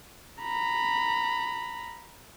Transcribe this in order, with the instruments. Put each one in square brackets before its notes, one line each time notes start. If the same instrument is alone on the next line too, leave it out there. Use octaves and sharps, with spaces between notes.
[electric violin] A#5 B5